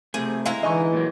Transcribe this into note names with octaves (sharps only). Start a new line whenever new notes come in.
C3 A3 G#4
G#3 E4 F5 A#5
D3 E3 D#4 D#5 G#5 C#6
A#2 F#3